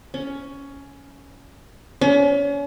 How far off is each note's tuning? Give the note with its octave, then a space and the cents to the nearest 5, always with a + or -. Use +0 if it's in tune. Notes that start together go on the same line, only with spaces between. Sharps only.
C#4 +10
C#4 +35